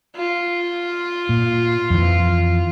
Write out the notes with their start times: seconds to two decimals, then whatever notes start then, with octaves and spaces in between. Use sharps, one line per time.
0.16 F4
1.29 A#2
1.90 F2 E3